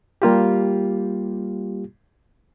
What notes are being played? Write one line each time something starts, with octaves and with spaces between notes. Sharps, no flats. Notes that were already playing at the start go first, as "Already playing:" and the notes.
G3 A#3 F4 G4